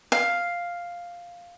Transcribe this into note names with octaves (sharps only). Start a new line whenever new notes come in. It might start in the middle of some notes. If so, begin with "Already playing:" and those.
F5